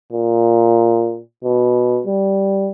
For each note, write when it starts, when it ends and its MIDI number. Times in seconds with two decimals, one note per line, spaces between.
0.13 1.19 46
1.44 2.01 47
2.07 2.72 55